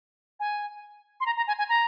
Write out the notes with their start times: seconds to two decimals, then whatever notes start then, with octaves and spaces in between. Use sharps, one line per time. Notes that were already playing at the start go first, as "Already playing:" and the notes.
0.40 G#5
1.20 C6
1.26 A#5
1.37 A#5
1.47 G#5
1.58 G#5
1.69 A#5